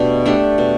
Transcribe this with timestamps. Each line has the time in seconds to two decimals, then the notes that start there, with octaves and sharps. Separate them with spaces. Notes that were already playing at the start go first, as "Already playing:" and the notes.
Already playing: B2 A3 D4 G4
0.26 A3 D4 G4
0.58 B2